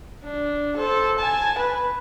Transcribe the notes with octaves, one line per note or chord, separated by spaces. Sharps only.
D4
A4 C5
G#5 A5
B4